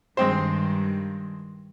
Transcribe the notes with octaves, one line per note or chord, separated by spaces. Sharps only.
G2 D#3 G#3 C4 C5